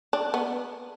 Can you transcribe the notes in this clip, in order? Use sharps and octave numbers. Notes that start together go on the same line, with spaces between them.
D4
B3